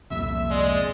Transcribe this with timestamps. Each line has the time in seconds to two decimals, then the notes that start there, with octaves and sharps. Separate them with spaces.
0.10 C2 F2 A#2 E5
0.50 G#3 D5